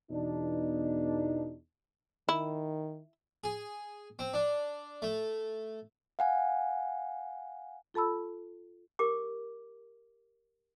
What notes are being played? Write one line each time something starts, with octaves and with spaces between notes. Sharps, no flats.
E2 B2 D4 D#4
D#3 E4
G#4
C4
D4
A3
F5 F#5 G#5
F4 A4 A5 B5 E6
G4 A#4 D6